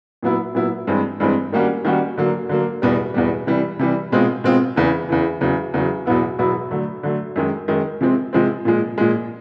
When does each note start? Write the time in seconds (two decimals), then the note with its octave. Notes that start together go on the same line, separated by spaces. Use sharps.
0.23 A#2 F#3 B3 E4
0.55 A#2 F#3 B3 E4
0.87 G2 E3 G#3 C4
1.20 G2 E3 G#3 C4
1.52 D#3 G3 A#3 C#4 F#4
1.85 D#3 G3 A#3 C#4 F#4
2.17 D3 F#3 A#3
2.49 D3 F#3 A#3
2.82 E2 B2 G3
3.14 E2 B2 G3
3.47 C3 E3 G3
3.79 C3 E3 G3
4.12 B2 G#3 C4 F4
4.44 B2 G#3 C4 F4
4.76 E2 C#3 E3
5.09 E2 C#3 E3
5.41 E2 C#3 F#3
5.74 E2 C#3 F#3
6.06 E2 B2 F#3 B3 E4
6.39 E2 B2 F#3 B3 E4
6.71 D3 F#3 A3
7.03 D3 F#3 A3
7.36 F#2 D#3 G#3
7.68 F#2 D#3 G#3
8.01 C3 F3 G#3 C4
8.33 C3 F3 G#3 C4
8.65 A#2 F3 G#3
8.98 A#2 F3 G#3